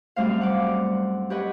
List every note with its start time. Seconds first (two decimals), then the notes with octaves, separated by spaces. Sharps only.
0.16 F#2 G3 A3 C4 C5 F5
0.41 F#5 D6
1.30 G4 B4 C#5 D#5 F#5